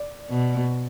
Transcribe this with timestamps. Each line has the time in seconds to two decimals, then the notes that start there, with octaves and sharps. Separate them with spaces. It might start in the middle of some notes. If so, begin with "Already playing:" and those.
Already playing: D5
0.30 B2